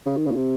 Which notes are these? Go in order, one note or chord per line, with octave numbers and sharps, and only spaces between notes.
C#3
D#3
C#3
A#2
C3